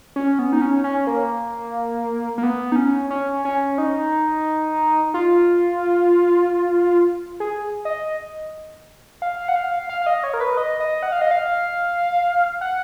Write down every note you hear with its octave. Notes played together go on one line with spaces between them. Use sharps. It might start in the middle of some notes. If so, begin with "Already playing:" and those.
C#4
B3
D#4
C#4
C#4
A#3
A#3
B3
D#4
C#4
C#4
C#4
D#4
F4
G#4
D#5
F5
F#5
F5
F5
F5
D#5
C#5
A#4
B4
D#5
D#5
F#5
F5
D#5
F5
F#5